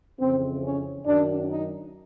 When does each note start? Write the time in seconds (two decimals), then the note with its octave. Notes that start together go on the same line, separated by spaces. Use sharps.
0.20 F2 C#3 E3 C4
0.64 C#4
1.06 F#2 D#3 D4
1.50 D#4